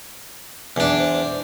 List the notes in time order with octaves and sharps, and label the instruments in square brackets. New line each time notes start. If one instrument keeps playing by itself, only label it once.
[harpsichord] E2 D4
[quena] C5